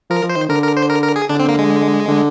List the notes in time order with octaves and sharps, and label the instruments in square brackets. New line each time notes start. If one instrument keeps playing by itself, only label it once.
[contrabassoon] F3 [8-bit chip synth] A#4
[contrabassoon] F3
[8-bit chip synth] C5
[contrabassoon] D#3
[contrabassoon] D3 [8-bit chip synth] A#4
[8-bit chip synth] A#4
C5
A#4
A#4
G#4
[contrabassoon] D3 [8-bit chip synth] D4
[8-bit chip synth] C4
A#3
G#3
[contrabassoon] D3